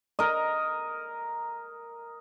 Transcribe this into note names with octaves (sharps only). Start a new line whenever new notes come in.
A#4 D#5